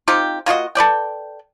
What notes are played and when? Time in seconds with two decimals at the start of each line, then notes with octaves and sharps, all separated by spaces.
0.08 C4 D#4 F4 G4
0.46 A#3 F4 F#4 D#5
0.75 A4 B4 D5 G5